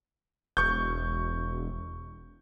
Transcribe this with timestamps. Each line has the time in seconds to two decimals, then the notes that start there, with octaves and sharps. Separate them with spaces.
0.57 E1 C#6 G6